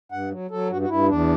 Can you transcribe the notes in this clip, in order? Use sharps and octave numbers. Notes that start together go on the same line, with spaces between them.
G2 F#5
F#3
F#3 A4
G2 F#4
F#4
G2 E4
E2 D4